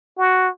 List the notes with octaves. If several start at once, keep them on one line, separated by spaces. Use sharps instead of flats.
F#4